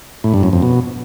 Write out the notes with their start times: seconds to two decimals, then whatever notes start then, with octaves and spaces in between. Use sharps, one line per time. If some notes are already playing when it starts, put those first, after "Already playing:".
0.24 A2
0.34 G2
0.43 F#2
0.53 F2
0.62 B2